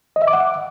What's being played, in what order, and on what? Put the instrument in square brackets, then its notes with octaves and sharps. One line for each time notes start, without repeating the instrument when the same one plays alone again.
[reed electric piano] D#5
E5
D6
F#5